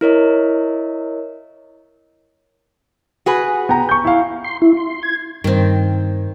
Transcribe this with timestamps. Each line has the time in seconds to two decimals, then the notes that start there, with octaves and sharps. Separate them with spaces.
0.01 E4 A#4 C#5 D#5
3.26 F#4 G#4 B4
3.69 B3 G5 A#5
3.89 C#6 G6
4.05 E4 F5
4.44 C6
4.62 E4
4.77 C6
5.03 G#6
5.44 G2 D#3 C4